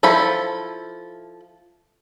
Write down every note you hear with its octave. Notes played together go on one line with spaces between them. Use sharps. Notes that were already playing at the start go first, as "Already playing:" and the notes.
F3 E4 A4 G5 B5